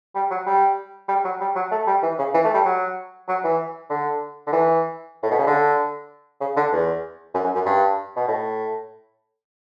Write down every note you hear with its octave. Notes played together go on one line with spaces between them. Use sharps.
G3
F#3
G3
G3
F#3
G3
F#3
A3
G3
E3
C#3
E3
A3
G3
F#3
F#3
E3
D3
D3
E3
A2
B2
C#3
D3
C#3
D3
E2
F#2
F#2
F#2
G2
B2
A2